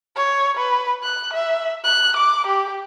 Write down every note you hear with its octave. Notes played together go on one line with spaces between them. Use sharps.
C#5
B4
F#6
E5
F#6
D6
G4